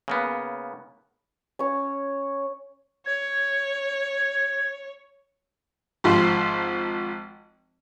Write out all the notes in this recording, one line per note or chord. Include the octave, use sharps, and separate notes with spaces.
C#3 A#3 B3
C#4 C#5
C#5 G#6
G#1 F3 C5